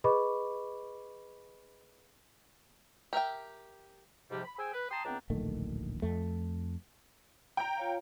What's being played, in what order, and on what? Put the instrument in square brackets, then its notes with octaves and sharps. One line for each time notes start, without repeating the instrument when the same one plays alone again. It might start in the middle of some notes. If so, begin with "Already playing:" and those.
[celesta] G#4 B4 D#5 B5 C#6 D6
[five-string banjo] G4 A#4 E5 G5
[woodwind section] G#2 C3 F3 G3 G4
B5
G#4 C5 G5 G#5 E6
B4
G5 A5 A#5 C6 D#6
C#2 B3 C4 D4 G5 A#5
[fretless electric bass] D1 A#1 D#3 A3
F2 A3
[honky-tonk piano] G5 A#5
[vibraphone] F4 C#5 F5